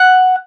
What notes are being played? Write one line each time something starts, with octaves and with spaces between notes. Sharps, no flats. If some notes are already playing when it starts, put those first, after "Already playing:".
Already playing: F#5